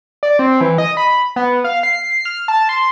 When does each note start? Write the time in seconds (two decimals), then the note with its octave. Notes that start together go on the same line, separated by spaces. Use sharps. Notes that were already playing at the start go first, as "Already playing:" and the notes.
0.23 D5
0.39 C4
0.61 E3
0.78 D#5
0.97 B5
1.36 B3
1.64 F5
1.83 C7
2.25 F6
2.48 A5
2.69 C6